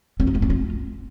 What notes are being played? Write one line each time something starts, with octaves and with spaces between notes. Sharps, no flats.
C#4
D#4
A3
C#4
F4